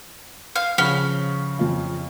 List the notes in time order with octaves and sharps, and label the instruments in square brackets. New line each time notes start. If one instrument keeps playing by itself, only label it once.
[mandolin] F5
[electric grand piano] C#3 F3 [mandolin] C#4 [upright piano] F#5 B5
[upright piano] F2 F4